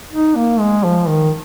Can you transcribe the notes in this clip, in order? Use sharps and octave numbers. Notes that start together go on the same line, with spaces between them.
D#4
A#3
G#3
F3
D#3